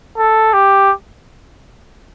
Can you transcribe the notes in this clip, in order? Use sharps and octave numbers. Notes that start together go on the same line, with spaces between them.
A4
G4